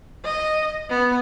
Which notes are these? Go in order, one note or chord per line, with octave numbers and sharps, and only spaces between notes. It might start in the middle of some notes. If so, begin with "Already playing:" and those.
D#5
B3